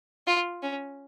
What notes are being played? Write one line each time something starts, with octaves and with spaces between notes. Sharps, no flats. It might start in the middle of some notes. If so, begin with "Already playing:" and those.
F4
C#4